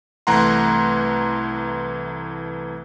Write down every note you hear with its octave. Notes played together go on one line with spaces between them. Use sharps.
C2 E3 A3 F#5 A#5 C6